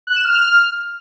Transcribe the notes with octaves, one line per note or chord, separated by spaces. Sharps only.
F#6
E7
F6